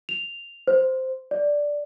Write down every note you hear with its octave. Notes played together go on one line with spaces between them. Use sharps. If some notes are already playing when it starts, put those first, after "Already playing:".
F7
C5
D5